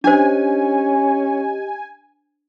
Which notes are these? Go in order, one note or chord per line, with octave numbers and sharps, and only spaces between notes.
C#4 D4 G4 C5 D#5 G#5